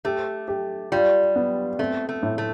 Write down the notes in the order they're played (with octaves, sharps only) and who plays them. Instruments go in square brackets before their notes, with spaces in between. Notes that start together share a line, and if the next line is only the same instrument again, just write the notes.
[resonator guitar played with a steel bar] A3 [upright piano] G4
[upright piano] G4
[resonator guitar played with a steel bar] G3 [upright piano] F4
[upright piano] B3
[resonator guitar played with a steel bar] A3 [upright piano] C4
[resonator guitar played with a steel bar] A3
[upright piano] A2
[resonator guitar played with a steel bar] A3